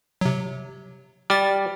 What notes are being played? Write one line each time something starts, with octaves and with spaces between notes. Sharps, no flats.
C3 F#3
G3 D5 F6 A6